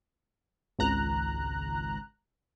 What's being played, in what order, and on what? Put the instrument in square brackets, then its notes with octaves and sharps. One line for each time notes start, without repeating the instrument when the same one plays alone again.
[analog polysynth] G#1 C#2 A#5 F#6